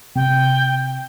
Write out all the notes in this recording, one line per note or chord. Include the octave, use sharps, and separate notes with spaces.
C3 G5